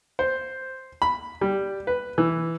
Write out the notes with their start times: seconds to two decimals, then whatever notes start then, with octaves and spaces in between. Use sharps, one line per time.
0.19 C5
1.02 B5
1.41 G3
1.87 B4
2.18 E3